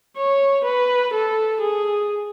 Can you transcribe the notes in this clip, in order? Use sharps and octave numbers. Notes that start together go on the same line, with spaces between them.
C#5
B4
A4
G#4